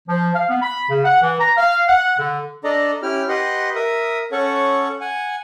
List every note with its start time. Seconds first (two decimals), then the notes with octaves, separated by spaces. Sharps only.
0.09 F3
0.35 F5
0.49 B3
0.62 B5
0.90 C#3
1.05 F#5
1.23 E3
1.40 A#5
1.57 F5
1.89 F#5
2.19 D3
2.64 D4 A4 D5 D#5 A#5
3.03 C#4 E4 G4 F6
3.29 G4 B4 D#5 F#5 C6
3.75 A#4 E5 D#6
4.32 C#4 A4 C#5 F#5 C#6
5.01 F#5 G#5